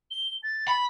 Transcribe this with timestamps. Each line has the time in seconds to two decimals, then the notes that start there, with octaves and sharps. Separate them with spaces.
0.11 G7
0.43 A6
0.68 B5